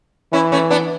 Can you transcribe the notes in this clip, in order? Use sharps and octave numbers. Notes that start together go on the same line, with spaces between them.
E3 C#4 E4
A3 C#4
B3 D4